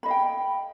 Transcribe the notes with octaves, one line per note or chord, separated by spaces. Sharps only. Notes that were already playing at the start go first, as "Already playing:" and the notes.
D#5 F5 G5 B5